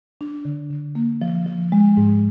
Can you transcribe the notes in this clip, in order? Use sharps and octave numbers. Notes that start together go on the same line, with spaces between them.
D4
D3
D3
A#3
F3
F3
G#3
G#2